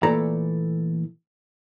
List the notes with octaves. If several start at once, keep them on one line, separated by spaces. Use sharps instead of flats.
A#2 E3 A3 A4 D5 A#5